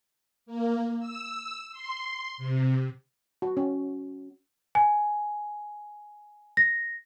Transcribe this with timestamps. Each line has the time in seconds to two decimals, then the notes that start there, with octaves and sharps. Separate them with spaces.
0.46 A#3
0.99 E6
1.72 C6
2.38 C3
3.42 F#4
3.57 C#4
4.75 G#5
6.57 A#6